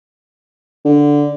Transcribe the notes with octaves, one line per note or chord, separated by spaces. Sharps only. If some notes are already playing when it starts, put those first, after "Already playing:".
D3